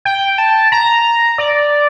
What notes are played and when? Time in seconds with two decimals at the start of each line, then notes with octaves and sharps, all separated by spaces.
0.05 G5
0.38 A5
0.72 A#5
1.38 D5